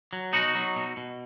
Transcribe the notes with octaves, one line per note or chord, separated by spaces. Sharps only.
F#3
B2 D#4 F#4
F#3
B2
B2